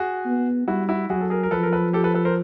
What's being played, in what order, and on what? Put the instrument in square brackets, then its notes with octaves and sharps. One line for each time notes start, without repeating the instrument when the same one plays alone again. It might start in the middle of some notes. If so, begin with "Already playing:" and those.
Already playing: [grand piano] F#4 G#4
[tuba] B3
[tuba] G3 [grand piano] E4 F#4
[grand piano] E4 F#4
[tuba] F#3 [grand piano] F#4 G#4
[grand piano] A4
G#4 A#4
A#4
[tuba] F3 [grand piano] A4 B4
[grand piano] A#4
A4 B4
G4 A4
A4 B4
A4 B4
A#4 C5